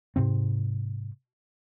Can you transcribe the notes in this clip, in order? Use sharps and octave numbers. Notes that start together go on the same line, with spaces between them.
G#2 C3 C4